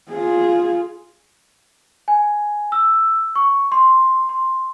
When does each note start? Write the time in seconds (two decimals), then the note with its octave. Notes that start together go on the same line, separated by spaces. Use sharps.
0.10 F4 G#4
2.08 G#5
2.72 E6
3.36 C#6
3.72 C6
4.29 C6